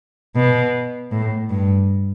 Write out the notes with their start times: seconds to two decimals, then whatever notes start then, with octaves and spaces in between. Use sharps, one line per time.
0.36 B2
1.11 A2
1.50 G2